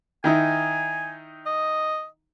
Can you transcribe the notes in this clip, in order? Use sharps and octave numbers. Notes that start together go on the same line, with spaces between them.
D#3 D#4 E4 G#5
D#5